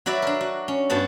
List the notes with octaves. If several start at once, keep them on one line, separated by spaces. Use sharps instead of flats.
F#3 F#4 B4 D5 E5
D4 A#4
F#4
C#4
G2 B3 F#4 A5